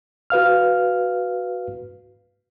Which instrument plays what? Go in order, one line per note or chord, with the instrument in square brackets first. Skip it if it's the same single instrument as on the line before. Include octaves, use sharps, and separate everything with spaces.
[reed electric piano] F#4 B4 F5 F6